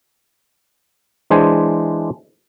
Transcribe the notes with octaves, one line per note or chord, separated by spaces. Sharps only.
E3 G#3 D4 C5 G#5